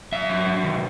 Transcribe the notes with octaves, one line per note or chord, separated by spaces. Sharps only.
F#2 E5
F#3
F#3
D#3